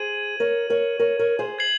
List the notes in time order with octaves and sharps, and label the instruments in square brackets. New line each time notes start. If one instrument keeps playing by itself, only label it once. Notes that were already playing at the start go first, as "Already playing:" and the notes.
Already playing: [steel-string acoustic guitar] G#4 C5 [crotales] G#6 D#7 F#7
[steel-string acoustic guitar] A#4 C#5
A#4 C#5
A#4 C#5
A#4 C#5
G#4 C5
[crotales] G#6 C7 F#7